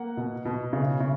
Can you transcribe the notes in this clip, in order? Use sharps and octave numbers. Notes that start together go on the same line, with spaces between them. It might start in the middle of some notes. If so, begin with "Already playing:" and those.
Already playing: A#3 F#5
B2
B2
C#3
C#3